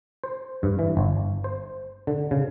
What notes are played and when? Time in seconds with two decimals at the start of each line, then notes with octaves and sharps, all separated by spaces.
0.24 C5
0.63 G2
0.79 E3
0.97 G1
1.44 C5
2.07 D3
2.31 C#3